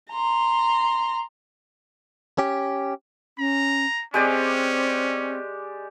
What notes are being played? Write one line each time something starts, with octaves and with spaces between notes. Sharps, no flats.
A#5 C6
C#4 G4
C#4 A#5
G#3 C4 C#4 G4 D5